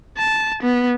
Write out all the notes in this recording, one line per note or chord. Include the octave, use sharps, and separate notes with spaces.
A5
B3